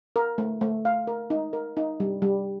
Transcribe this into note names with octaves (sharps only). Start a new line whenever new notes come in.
A#4
A3
A3
F5
A#4
D#4
A#4
D#4
G3
G3